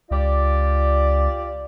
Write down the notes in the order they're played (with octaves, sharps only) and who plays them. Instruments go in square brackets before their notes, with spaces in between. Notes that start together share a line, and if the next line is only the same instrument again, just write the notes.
[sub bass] C#2 [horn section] F4 G4 D5